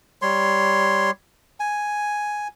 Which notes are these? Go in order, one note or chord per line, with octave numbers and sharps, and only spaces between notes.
G3 C#5 C6
G#5